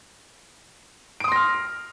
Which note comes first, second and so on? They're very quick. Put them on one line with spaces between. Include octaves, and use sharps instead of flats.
D7 D#6 C6 A#6 F6